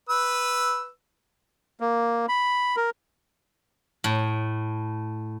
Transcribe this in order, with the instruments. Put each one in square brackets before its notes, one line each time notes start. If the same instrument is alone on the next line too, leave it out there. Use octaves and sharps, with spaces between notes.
[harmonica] B4 E6
[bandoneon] A#3
B5
A#4
[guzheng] A2